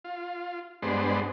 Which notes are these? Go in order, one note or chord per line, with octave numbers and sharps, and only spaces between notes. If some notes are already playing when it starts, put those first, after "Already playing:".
F4
G2 G#3 B3 D4 C5